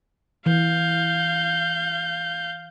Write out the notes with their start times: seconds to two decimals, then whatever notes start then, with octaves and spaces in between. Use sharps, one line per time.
0.46 E3 F5 G6